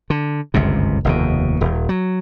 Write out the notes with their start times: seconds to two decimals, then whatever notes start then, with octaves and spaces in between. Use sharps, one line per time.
0.10 D3
0.54 G1 C#2 F#2 C3
1.05 F1 D#2 B2
1.61 D#1
1.89 F#3